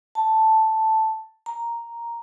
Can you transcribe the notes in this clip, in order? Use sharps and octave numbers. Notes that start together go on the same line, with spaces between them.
A5
A#5